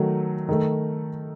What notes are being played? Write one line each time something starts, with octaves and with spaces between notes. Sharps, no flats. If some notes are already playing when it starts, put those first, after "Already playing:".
Already playing: D#3 F#3 A3
D#3 A3